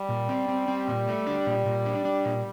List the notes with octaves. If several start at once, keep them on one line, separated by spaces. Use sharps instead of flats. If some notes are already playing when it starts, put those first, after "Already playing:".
Already playing: G3
A#2
C4
C4
C4
A#2
A3
D4
A#2
A#2
D4
D4
A#2